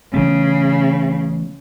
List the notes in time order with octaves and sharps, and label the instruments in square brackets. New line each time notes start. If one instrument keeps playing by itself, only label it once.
[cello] C#3 [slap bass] E3 A3 B3